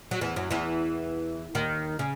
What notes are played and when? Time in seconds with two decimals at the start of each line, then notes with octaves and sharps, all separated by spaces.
0.11 F#3
0.21 E2 E3
0.36 F#2 F#3
0.51 E2 E3
1.55 D#2 D#3
1.99 C#3